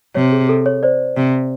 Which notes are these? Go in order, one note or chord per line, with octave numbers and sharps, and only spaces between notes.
C3 C#5
G#4
A4
C#5
C5 D5
C3